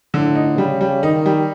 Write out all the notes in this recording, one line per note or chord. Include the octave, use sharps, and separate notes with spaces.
A2 D3
D#4
C#3 G3
G3
D#3 D#4
G3